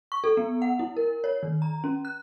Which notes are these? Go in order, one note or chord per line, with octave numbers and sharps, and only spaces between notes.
C#6
A4
B3
F#5
E4
A#4
C#5
D#3
A#5
C#4
F#6